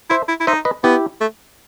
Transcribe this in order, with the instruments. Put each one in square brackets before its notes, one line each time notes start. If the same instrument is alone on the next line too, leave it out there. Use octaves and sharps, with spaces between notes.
[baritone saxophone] E4 [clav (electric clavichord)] C5 E5
[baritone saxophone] E4
E4
[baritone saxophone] D#4 [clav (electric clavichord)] C5 E5
[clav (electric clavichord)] B4 D#5
[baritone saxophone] B3 [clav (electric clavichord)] E4 G4
[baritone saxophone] A3